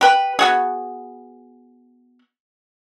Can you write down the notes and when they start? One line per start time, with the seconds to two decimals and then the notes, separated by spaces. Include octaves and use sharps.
0.01 G4 B4
0.39 B3 F#4 G#4